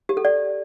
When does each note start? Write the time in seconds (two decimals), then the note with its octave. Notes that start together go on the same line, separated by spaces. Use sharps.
0.09 G4
0.17 A4
0.25 D5